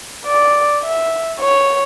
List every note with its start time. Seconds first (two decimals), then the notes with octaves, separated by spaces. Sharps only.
0.26 D5
0.83 E5
1.40 C#5